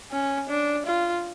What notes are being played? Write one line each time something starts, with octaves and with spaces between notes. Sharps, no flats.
C#4
D4
F4